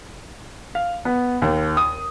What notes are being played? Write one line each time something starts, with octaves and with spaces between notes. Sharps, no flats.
F5
B3
D#2
D#6